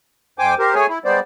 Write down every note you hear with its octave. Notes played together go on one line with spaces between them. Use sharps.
F2 C5 G5 G#5 D6
G4 A#4 C5
A3 G#4 C#5 G#5
E4
G3 G#3 B3 C5 D5